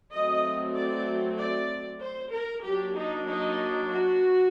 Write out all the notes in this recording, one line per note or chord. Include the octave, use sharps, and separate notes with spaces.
F#3 A3 C4 D#5
D5
D5
C5
A#4
F#3 A#3 D4 G4
D#4
D#4
F#4